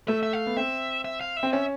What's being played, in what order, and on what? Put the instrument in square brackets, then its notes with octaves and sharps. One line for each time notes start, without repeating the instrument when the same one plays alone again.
[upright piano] A3 [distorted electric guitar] E5
[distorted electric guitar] E5
F5
[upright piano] B3
[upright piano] C4 [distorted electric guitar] E5
[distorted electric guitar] E5
F5
E5
[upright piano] C4
[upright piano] C#4 [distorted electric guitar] E5